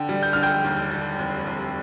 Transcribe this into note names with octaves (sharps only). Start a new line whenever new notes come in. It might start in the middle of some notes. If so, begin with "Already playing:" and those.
Already playing: D3 G5
G3
G6
D3 F6
G5 G6
D#2
G3
F1
F1